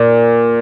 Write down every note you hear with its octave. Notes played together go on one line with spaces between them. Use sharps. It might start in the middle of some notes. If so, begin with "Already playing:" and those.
Already playing: A#2